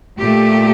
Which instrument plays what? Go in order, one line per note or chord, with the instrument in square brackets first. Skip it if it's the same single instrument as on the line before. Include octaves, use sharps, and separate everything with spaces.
[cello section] A#2 A3 G4